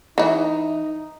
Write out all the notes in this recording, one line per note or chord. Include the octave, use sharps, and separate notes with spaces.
E3 D#4 E4